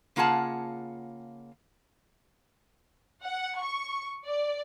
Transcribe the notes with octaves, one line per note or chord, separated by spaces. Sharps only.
C#3 A#3 F4 G#4 F#5 A5
F#5
C#6
D5